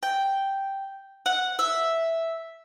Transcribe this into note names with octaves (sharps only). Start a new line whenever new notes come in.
G5
F#5
E5